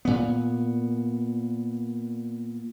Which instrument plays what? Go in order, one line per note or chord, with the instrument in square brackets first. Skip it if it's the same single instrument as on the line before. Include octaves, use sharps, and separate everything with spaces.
[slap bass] A#2 B3